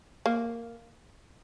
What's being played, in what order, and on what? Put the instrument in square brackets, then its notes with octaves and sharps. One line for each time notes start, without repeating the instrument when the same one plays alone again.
[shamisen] A#3